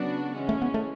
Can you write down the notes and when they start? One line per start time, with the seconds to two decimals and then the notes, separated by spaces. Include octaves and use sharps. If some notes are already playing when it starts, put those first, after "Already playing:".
Already playing: C#3 F#3 B3 D4 F#4
0.36 E3 G#3 C#4
0.49 A3
0.62 B3
0.74 A3